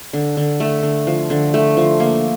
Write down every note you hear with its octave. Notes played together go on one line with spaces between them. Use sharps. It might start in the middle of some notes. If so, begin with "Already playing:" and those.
D3
D3
A3
D3
F3
D3
A3
F3
A#3